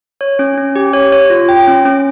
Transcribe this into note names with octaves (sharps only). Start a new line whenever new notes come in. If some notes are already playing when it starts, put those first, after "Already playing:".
C#5
C#4
C#4
G4
C#5
C#5
F4
G5
C#4
C#4